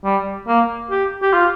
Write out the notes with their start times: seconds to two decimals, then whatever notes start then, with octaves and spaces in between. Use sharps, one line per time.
0.04 G3
0.47 A#3
0.91 G4
1.22 G4
1.33 F4